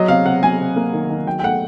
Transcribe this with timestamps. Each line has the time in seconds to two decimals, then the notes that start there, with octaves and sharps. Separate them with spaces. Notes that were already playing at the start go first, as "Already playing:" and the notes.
Already playing: F#3 D#5
0.08 C3 F5
0.25 C3 F#5
0.43 F#3 G#5
0.60 C3
0.76 A#3
0.93 D#3
1.10 D#3
1.27 F#3 G5
1.39 G5
1.43 A3 F#5